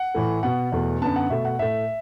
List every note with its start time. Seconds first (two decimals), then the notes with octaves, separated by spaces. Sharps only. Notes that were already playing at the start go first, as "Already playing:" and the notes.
Already playing: F#5
0.15 A2 E3 A3
0.43 B2 B3 F#5
0.72 E2 B2 A3
1.02 F#2 D3 B3 A5
1.16 F#5
1.30 B2 A3 E5
1.45 F#5
1.59 A2 A3 E5